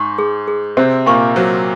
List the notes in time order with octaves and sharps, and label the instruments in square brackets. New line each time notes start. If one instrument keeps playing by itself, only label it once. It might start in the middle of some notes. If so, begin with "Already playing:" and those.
Already playing: [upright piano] G#2 [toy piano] C#6
[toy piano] G#4
G#4
[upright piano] C3 C4 [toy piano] C5
[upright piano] A#2 A#3 [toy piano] C#6
[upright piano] F#3 [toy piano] C5